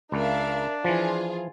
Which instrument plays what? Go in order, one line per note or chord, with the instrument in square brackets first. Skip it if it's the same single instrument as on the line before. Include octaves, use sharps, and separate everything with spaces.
[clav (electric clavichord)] C#2 [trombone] D4 [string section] A#4 E5 F5
[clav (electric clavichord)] E3 F3 [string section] F4 G#4